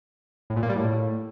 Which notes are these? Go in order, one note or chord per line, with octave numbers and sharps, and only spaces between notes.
A2
A#2
A#3
G3
A2